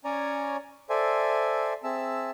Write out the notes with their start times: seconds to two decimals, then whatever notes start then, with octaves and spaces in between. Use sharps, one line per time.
0.05 C#4 C#5 D5 G#5 A#5
0.90 A4 C5 D5 E5 G#5
1.84 C4 G#4 E5 A5 E6